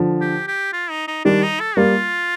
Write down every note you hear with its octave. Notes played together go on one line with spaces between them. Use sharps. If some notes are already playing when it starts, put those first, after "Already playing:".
Already playing: D3 F3
G4
G4
F4
D#4
D#4
D#3 G3 D4
D#4
A4
G3 A#3 F4